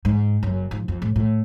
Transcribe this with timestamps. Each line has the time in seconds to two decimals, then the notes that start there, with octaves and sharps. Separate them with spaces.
0.05 G#2
0.43 F#1 F#2
0.71 G#2 F3
0.88 F2
1.02 A2
1.16 A2